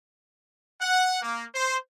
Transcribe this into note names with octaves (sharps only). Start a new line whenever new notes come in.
F#5
A#3
C5